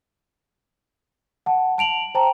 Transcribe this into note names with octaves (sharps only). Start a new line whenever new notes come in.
F#5 A5
A5 D7 F7 F#7
C5 G5 A5 A#5